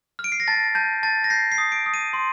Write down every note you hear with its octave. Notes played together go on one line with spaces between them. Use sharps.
F6
D7
C7
A#6
A5 A6
A5 G6
A5 A6
A#6
G6 C7
C7
D#6
D7
D#6
D#7
C6